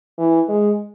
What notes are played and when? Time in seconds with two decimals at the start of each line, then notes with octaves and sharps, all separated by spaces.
0.19 E3
0.49 G#3